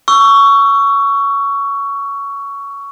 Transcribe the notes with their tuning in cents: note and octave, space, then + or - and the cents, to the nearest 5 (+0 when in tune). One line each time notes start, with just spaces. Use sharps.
C#6 +15 E6 +20